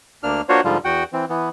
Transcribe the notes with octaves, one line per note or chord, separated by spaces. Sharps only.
D2 A#3 D4 F6
A#3 D4 F4 F#4 C5 C#5
G#2 D3 F3 G3 F4
E2 F#4 F#5 G5
E3 C4
E3 B3